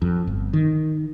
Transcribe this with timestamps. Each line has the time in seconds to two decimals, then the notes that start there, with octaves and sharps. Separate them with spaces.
0.02 F2
0.27 G1
0.53 D#3